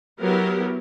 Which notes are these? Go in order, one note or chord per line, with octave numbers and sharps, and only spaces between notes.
F#3 B3 E4 G4 A#4